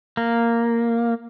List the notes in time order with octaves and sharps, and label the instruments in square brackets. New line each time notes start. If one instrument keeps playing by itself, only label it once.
[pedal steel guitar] A#3